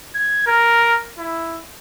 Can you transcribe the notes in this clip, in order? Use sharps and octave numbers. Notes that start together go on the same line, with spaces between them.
G#6
A#4
E4